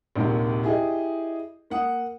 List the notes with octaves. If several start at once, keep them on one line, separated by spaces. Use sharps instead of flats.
A#1 D#2 G#2 C3 D#3
E4 G4 G#4 D#5
A#3 F#5 D#6